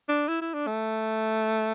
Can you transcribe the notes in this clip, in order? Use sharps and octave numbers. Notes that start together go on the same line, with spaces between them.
D4
E4
E4
D4
A3